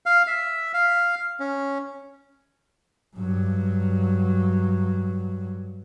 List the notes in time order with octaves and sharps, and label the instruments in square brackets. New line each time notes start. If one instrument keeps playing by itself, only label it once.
[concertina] F5
E5
F5
C#4
[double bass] G2 F#3